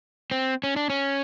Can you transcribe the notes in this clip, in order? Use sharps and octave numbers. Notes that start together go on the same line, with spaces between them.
C4
C#4
D4
C#4